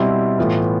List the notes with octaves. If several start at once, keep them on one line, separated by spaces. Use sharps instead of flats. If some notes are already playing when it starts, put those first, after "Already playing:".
Already playing: B2 G3 C4 E4
A2 E3 B3 F4